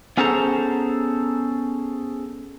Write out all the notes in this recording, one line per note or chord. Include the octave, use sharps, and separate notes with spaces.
B3 C#4 G#4 A4 C5 A#5